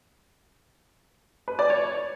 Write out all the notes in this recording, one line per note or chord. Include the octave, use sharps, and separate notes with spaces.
B4
D5
C#5